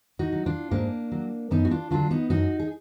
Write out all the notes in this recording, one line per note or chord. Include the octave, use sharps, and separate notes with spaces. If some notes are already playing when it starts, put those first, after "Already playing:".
D#4 F#4
F#3
D4 F4
G#2 A#3 D4
F#3
F#2 B3 D#4
F#4
D4 F4
D3 F#3 D4 F4
B3 D#4
F#2 D#4 F#4
G#4